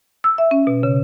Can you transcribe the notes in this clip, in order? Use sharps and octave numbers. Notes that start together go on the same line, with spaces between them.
E6
E5
C#4
B2
C#3